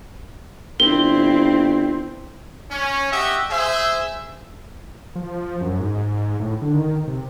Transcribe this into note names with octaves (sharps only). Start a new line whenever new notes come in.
G1 C4 E4 G7
C#4
F#4 G4 D#5 E5
G#4 C5 E5
F3
F#2
G#2
A2
D3
D#3
C3